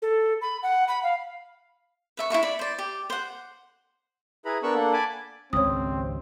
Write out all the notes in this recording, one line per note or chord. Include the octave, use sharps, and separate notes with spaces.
A4
B5
F#5
B5
F5
B4 E5 C#6
E4 G#4 E5 C#6
D5 B5
C5 D5
G4
C5 F#5
E4 G#4 B4 A#5 B5
B3 D4 A#4 C#6 E6 F#6
A#3 D4 A4 F#5
G#5 A5 B5 D6
G#1 C#2 C4 C#5 D#6